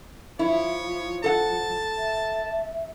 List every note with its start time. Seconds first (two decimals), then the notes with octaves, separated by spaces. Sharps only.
0.39 F3 E4 C#5
1.24 A4 F#5 A5
1.98 E5